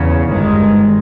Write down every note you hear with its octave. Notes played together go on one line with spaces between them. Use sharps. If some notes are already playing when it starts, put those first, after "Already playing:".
Already playing: E2 C#3
G1 G2 D#3 G#3